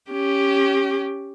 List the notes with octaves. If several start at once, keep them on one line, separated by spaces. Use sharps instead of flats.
C#4 G4